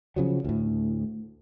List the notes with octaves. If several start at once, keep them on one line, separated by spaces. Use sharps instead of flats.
C#3 F3 F#3
D2 A2